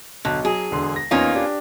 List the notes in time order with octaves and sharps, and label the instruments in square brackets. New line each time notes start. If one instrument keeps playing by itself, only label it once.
[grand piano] B1 [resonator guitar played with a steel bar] D3
[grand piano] F#3 [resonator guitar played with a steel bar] G#4
[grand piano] E1 D3 C6
A#6
[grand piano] E2 D#4 [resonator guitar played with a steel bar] A#3 C#4 F4
[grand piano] D4 G4